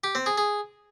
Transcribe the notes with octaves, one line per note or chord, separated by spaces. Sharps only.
G4
C4
G#4
G#4